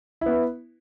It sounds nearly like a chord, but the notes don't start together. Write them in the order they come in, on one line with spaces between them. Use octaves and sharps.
E4 B3 B4